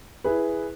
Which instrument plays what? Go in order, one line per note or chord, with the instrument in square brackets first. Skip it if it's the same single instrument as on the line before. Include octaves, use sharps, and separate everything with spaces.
[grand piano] E4 G#4 B4